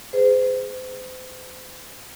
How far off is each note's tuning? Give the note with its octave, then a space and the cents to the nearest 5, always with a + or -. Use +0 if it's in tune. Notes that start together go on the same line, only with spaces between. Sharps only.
G#4 +0 C5 -40